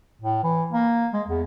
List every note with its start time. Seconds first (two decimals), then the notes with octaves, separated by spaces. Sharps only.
0.21 A2
0.44 E3
0.73 A#3
1.13 G#3
1.27 E2